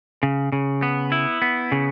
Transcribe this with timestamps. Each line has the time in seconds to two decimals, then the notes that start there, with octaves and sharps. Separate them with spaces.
0.23 C#3
0.52 C#3
0.82 B3
1.12 E4
1.42 B3
1.72 C#3